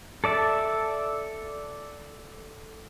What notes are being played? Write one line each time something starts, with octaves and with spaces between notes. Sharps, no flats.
A4 D5 E5 A5